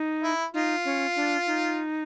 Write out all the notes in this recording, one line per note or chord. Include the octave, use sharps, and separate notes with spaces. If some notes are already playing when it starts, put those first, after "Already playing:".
Already playing: D#4
E4
D#4 F4
C#4
D4
D#4